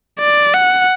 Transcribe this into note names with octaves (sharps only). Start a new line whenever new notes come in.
D5
F#5